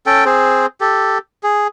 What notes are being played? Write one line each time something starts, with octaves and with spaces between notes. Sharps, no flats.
C#4 A4 G5
C4 G#4 C5
G4 A4
G#4